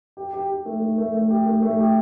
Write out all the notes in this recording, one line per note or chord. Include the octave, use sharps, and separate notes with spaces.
G4
G4
G4
A3
A3
A3
A3
G4
A3
A3
G4